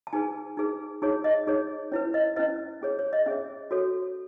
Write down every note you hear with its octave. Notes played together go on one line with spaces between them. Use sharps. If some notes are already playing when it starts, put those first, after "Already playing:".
A5
D#4 G#4 B4 G#5
D#4 G#4 B4
D#4 G#4 C#5
D#5
D#4 G#4 C#5
C#4 E4 B4 C#5
D#5
C#4 E4 B4 D#5
C#4 G#4 C#5
C#5
D#5
C#4 G#4 C#5 E5
F#4 A4 C#5